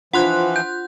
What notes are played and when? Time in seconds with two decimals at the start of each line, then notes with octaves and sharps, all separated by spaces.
0.13 E3 F3 D4 F4 C5 F#5 C6 F#6
0.56 F#5 G6